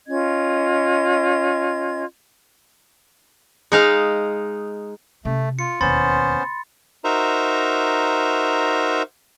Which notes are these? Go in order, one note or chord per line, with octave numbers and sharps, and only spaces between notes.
C#4 F4 D#5 G#6
G#3 D#4 F5
C3 A3 C#4
F4 C#7
E1 D#2 B3 C#4 C5 B5 C6 A6
D#4 F#4 A#4 C5 E5 A#5